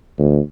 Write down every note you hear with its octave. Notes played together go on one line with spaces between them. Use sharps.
D2